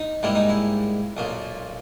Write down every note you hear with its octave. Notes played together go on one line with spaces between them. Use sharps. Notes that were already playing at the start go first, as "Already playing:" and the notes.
Already playing: D#4
G#2 G3 A#3 E4
D#4
E4
B1 A#2 A#3